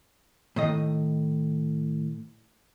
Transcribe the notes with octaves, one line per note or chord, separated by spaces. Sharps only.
A2 D#3 D#5